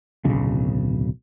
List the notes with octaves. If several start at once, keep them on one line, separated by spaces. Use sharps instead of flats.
D1 B1 C#3